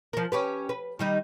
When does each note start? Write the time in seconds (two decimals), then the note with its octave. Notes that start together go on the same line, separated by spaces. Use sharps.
0.13 F3 A#4
0.32 C#4 G4 B4
0.69 B4
0.99 D#3 G3 D#4